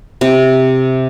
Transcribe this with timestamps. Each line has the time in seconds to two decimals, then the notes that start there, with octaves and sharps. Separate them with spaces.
0.21 C3